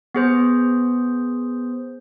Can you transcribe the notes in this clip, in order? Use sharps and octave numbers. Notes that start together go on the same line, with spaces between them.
B3 G#4 C5